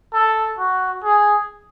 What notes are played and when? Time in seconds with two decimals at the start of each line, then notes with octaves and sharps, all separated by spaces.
0.13 A4
0.59 F#4
1.04 G#4